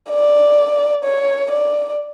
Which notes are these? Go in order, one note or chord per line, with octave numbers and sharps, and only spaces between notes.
D5
C#5
D5